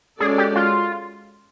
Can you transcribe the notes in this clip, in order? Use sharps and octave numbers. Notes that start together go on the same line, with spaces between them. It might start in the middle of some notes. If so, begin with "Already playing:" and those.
G#3 C#4 F#4 G#4 A4 D5
G4
F4